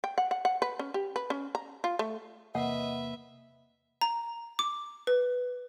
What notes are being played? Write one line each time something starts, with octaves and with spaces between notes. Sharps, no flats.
G5
F#5
F#5
F#5
B4
C#4
G4
B4
C#4
A#5
F4
A3
E2 C3 A#3 B4 D#5 E5 F#5
A#5
D6
B4